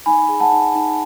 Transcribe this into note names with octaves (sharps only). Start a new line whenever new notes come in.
D#4 G#5 B5
G#4
F#5 A5
D#4
D#4